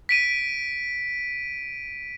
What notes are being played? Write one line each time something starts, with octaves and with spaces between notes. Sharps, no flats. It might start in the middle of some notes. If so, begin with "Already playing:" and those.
B6 D7 D#7